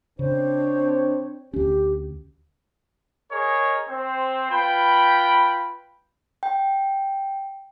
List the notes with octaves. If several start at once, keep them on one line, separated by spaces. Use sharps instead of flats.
C#3 C4 D4 C5 C#5
D2 C#4 G4
G#4 A#4 C#5 D#5
C4 C5
F4 B4 G5 B5
G5